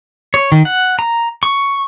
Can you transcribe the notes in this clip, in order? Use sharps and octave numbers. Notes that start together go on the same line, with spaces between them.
C#5
D#3
F#5
A#5
C#6